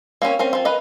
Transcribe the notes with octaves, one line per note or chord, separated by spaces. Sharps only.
A#3 C4 C#4 C#5
C4 C#4 A#4
F3 C4
A#4 B4 D#5